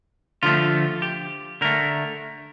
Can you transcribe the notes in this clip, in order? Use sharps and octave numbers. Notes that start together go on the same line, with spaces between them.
D3 F3 A3 F4
G4
D3 A3 A#4